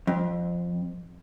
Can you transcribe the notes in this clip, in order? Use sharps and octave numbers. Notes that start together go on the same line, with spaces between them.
F2